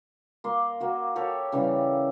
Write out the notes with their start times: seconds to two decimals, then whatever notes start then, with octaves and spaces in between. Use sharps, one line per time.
0.44 A#3 C6
0.80 A#3 F#4
1.16 G4 A4 A#4 C#5
1.52 C#3 E3 G3 F5